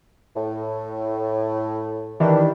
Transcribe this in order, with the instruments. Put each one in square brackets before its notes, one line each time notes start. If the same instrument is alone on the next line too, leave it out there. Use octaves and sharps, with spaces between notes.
[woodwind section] A2
[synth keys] D#3 E3 [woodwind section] G3 D4